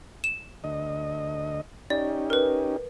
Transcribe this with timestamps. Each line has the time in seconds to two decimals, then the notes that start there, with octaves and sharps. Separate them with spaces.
0.24 E7
0.64 D2 D#5
1.90 C#4 D#4 G4 D5
2.30 A#4 B4